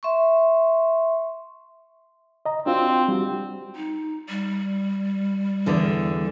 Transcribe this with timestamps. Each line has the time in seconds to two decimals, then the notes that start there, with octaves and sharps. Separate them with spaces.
0.03 E5 C6 C#6
2.46 D#5 A#5
2.66 C4 D4 F4 F#4
3.08 G3 F#4
3.76 D#4
4.29 G3
5.66 E2 D3 E3